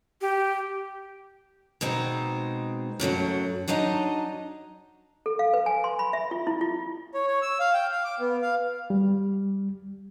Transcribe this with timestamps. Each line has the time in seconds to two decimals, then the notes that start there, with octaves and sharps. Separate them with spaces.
0.21 G4
1.81 B2 G#3 C4 D#4
3.00 F#2 A2 E3 F#3
3.68 F#3 D4 D#4 D#5 A#5
5.26 A4
5.39 F5
5.54 B4
5.66 G#5
5.84 C6
5.99 B5
6.13 E5
6.31 F4
6.47 E4
6.61 F4
7.14 C#5
7.27 C#5
7.42 E6
7.60 F5
7.74 G5
7.92 F5
8.04 D6
8.20 B3
8.42 F5
8.90 G3